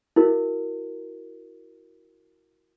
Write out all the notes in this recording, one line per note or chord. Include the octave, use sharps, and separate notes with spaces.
E4 F#4 A#4